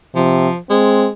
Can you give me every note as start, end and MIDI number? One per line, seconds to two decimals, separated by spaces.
0.16 0.49 48
0.16 0.57 53
0.70 1.10 56
0.70 1.07 60